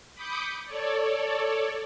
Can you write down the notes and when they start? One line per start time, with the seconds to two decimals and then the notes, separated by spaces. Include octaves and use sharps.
0.15 B5 D6 D#6 G6 C#7
0.65 A4 C#5 D5